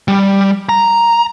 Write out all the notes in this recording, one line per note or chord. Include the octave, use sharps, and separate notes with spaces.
G3
A#5